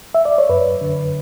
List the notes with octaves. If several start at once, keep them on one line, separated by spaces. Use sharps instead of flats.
E5
D5
C#5
F#2 B4
D3